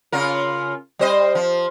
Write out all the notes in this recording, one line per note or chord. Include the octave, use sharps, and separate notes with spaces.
C#3 F4 A#4
G3 C5 D#5
F3